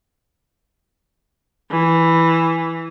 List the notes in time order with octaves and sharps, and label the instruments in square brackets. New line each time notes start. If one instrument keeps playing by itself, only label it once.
[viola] E3